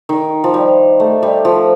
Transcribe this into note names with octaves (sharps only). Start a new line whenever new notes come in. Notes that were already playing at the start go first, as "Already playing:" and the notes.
D#3
F3
G3
A3
G3
F3